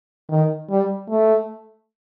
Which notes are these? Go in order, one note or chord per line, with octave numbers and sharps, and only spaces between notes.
D#3
G3
A3